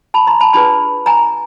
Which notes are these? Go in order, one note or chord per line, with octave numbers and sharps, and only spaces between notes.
A5 B5
A#5 C6
A5 B5
D4 F4 G#4 B4 A5 B5
G#5 A#5